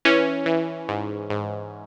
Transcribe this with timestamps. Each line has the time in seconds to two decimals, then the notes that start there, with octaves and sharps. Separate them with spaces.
0.05 E3 C#4
0.46 E3
0.89 G#2
1.30 G#2